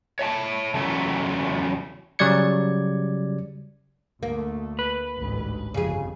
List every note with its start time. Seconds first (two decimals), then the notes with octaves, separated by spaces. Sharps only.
0.19 C#5 E5 A5
0.74 E2 C#3 F#3 A3 B3
2.19 C#3 F#3 G3 D5 G#6 C#7
4.23 D2 A3 A#3
4.79 B4
5.19 A1 D2 G#2
5.74 G1 F2 C#3 G#4